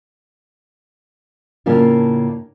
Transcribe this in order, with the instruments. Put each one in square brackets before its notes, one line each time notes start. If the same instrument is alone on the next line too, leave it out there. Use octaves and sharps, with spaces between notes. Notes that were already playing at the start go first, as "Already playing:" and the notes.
[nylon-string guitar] A2 C#3 A#3 C#4 D4 F4